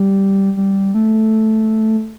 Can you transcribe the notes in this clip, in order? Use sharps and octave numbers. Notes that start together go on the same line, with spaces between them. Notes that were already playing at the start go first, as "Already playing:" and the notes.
Already playing: G3
G3
A3